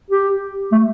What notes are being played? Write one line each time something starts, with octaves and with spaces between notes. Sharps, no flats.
G4
A3